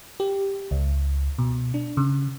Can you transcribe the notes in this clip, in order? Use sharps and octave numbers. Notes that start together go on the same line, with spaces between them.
G4
C#2
B2
D4
C#3